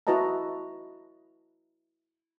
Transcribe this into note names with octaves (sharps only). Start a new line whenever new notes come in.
E4 F#4 B4 D#5 A5 A#5